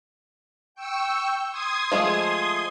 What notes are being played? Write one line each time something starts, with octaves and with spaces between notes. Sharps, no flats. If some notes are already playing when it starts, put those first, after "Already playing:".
G5 C#6 E6
C6 D#6 G#6
F3 G#3 A3